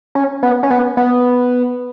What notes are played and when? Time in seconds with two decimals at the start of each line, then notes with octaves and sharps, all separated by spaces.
0.15 C#4
0.43 B3
0.63 C#4
0.70 B3
0.97 B3